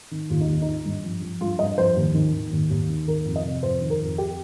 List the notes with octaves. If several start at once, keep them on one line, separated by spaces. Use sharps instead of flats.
D#3
D#2 F4
D#4
D#2
D#4
D#3
G2
F3
F3
G2 F4
G2 D#5
F3 C5
D#2
D#3
D#3
D#2
D#2
D#3
D#3 A#4
F2
D#5
C3
F2 C5
D#3
A#4
F2
G4